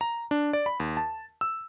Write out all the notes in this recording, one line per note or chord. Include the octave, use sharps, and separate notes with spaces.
A#5
D4
D5
B5
D#2
A5
E6